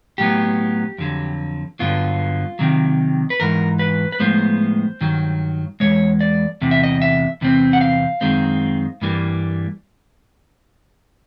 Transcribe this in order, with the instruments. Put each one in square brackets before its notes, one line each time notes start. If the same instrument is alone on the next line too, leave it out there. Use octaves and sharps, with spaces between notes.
[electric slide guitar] A2 F#3 B3 G4
F2 D3 F#3
G2 D3 F#3 B3 F4
C3 D#3 F#3
B4
G#2 E3 A#4
B4
B4
A2 F3 G#3 B3 C5
G2 D#3 F#3
E2 B2 G#3 C#5
D5
E2 C3
E5
D#5
E5
E2 C3 C4
F#5
F5
F#2 D#3 G#3 C4
G2 E3 G3 A#3